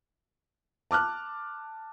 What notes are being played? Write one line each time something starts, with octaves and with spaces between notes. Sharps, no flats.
A5 D6 F6 F#6